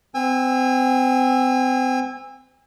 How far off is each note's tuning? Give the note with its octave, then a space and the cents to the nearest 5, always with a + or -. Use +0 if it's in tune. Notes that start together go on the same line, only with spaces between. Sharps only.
C4 -30 G#5 -35 E6 +0